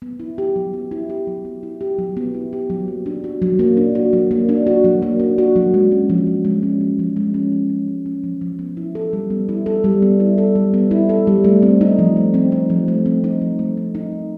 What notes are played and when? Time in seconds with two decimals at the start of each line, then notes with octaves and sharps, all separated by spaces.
0.02 B3
0.20 E4
0.38 G4
0.56 F#3
0.73 B3
0.91 E4
1.10 G4
1.27 F#3
1.45 B3
1.63 E4
1.81 G4
1.99 F#3
2.17 B3
2.34 E4
2.53 G4
2.70 F#3
2.88 A#3
3.06 D4
3.24 F#4
3.42 F#3
3.59 A#3
3.77 D4
3.95 F#4
4.13 F#3
4.31 A#3
4.49 D4
4.67 F#4
4.84 F#3
5.02 A#3
5.20 D4
5.38 F#4
5.56 F#3
5.74 G#3
5.92 C#4
6.10 F3
6.27 F3
6.45 G#3
6.63 C#4
6.81 F3
6.99 F3
7.16 G#3
7.34 C#4
7.52 F3
7.70 F3
7.88 G#3
8.06 C#4
8.24 F3
8.41 F3
8.59 B3
8.77 E4
8.95 A4
9.13 G3
9.30 B3
9.49 E4
9.66 A4
9.84 G3
10.02 B3
10.20 E4
10.38 A4
10.55 G3
10.74 B3
10.91 E4
11.09 A4
11.27 G3
11.44 A3
11.63 C4
11.81 D#4
11.99 F3
12.16 A3
12.34 C4
12.52 D#4
12.70 F3
12.88 A3
13.06 C4
13.24 D#4
13.41 F3
13.59 A3
13.77 C4
13.95 D#4
14.13 F3